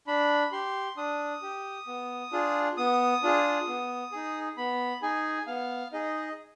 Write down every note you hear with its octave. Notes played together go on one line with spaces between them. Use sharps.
D4 B5
G4 C6
D4 D#6
G4
B3
D4 F4 G#4
B3 D#6
D4 F4 G#4
B3
D#4 G#4
B3 B5
D#4 G#4 G#5
B3 F5
D#4 G#4 D#5